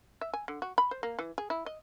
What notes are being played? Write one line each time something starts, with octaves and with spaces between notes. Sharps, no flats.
E5
G#5
D3
F#4
B5
C5
A#3
E3
G#4
E4
D#5